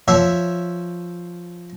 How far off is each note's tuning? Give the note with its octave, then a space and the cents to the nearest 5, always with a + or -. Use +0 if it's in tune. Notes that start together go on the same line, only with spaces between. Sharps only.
F3 +0 C#5 +0 E5 +0